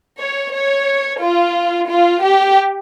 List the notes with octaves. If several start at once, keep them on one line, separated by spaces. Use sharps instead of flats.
C#5
C#5
F4
F4
G4